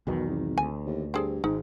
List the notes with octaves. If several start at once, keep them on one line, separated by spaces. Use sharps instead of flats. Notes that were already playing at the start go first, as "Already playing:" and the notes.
B1 E2 B2 D#3
G#1
D2 G#5
D#2
G2 C4 G#4 A4
G#1 G#2 D#4